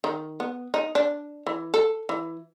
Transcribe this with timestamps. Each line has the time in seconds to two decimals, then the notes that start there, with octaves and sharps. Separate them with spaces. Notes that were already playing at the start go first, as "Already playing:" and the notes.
0.04 D#3
0.40 B3
0.74 D#4
0.95 D4
1.47 E3
1.74 A4
2.09 E3